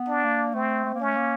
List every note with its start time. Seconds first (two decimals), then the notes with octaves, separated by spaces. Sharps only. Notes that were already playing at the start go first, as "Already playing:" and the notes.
Already playing: B3
0.09 D4
0.24 A#3
0.54 A3 C4
0.85 A3
0.94 A#3
1.00 A3 C#4
1.16 A#3